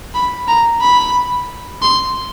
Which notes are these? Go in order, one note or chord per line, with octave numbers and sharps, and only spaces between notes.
B5
A#5
B5
C6